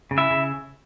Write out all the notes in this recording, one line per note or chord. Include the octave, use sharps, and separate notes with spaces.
C#3
E4 E5
C#3